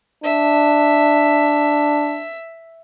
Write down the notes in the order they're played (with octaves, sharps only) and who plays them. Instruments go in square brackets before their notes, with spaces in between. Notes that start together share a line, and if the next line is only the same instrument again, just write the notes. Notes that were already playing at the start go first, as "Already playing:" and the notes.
[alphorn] D4 [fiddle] E5